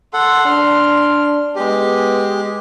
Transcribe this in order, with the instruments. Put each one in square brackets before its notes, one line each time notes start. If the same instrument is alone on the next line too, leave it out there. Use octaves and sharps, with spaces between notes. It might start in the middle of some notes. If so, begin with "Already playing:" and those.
[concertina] A4 F#5 [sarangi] C6
[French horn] D4 [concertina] F6
[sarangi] G#3 [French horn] B3 [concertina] G4